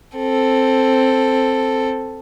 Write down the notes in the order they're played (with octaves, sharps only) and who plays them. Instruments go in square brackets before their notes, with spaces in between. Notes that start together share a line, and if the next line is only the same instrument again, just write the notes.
[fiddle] C4 A4